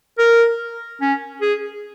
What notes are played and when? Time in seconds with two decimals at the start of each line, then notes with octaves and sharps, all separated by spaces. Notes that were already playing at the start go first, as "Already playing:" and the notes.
0.19 A#4
1.01 C#4
1.41 G#4